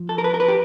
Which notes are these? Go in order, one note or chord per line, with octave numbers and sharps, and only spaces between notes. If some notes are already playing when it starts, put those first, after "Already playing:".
Already playing: F3
A4
A#4
B4
A#4
B4
G4